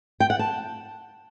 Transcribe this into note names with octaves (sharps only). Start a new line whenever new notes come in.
G5
F#5
A5